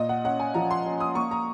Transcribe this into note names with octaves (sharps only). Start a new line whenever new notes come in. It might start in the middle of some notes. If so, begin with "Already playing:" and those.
Already playing: A#2 D#5
F#5
C#4 F#5
G#5
F3 A#5
C6
C#4
D#6
A#3 C#6
A#5